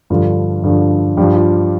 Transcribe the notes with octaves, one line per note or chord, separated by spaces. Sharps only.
G2 D3 F3 F4
G2 D3 F3
G2 F3 G4
F4